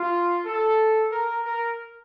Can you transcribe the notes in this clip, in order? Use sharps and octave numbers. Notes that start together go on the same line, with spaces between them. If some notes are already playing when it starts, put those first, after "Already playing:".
Already playing: F4
A4
A#4
A#4